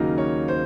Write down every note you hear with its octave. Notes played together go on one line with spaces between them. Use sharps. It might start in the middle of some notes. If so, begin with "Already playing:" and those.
Already playing: D#2 C#3 F#3 A#3 D#4
C#5
C5